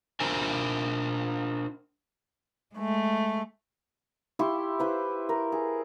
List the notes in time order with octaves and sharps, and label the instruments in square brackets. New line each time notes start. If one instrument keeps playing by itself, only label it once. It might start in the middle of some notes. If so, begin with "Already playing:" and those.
[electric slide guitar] D4 A#4 C5 G#5
[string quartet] G#3 A3
[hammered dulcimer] E4 G4 C6 C#6
E4 B4 C5
A#4
G#4